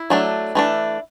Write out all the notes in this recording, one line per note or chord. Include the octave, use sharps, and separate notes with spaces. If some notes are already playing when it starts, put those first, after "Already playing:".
Already playing: E4
F#3 A3 D4
E3 A3 D4